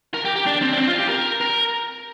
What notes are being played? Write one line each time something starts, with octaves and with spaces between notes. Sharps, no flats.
A#4
G4
G4
D4
C4
D4
C4
F4
G4
A#4
A#4